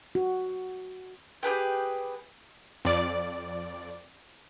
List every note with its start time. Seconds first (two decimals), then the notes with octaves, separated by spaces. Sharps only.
0.15 F#4
1.43 G4 G#4 B4 G5
2.85 F2 D5